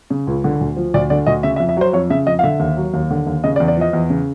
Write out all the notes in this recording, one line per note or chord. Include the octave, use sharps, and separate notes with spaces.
C#3
C#2
D3
D2
F3
D2 D5
D3 D5
D2 D#5
C#3 E5
E5
F2
E5
F#3 C5
F2 C#5
C#3 E5
F2 D#5
F5
D3 E5
D#2
F#3
D#2
D3
D#2
C#3 D#5
D5
E2
D5
F3 D#5
E2
C#3